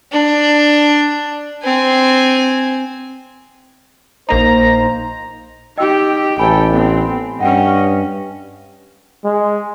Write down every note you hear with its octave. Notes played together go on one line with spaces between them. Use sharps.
D4
C4 G#5
A#1 A#3 D#4 C5 A#5
D#4 G4 D#5 G5 E6
A1 A4 G5 G#5 B5
B3 C4
G2 C#4 D#5 F#5 G5
G#3